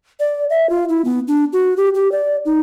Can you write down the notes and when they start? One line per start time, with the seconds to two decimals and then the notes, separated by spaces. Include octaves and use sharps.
0.20 D5
0.50 E5
0.70 F4
0.89 E4
1.05 B3
1.28 D4
1.53 F#4
1.77 G4
1.95 G4
2.12 D5
2.45 D#4